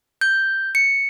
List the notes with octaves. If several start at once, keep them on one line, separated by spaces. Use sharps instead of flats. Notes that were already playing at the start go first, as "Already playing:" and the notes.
G6
C#7